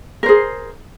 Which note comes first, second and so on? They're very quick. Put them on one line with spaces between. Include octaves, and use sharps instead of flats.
A#4 C5 G#4